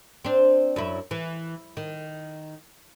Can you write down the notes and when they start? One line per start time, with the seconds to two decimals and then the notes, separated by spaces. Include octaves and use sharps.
0.25 C4 D4
0.76 F#2 E4
1.11 E3
1.77 D#3